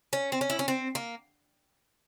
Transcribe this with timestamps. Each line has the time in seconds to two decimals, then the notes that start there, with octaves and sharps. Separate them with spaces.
0.13 C#4
0.32 C4
0.41 C#4
0.50 E4
0.59 C#4
0.68 C4
0.95 A#3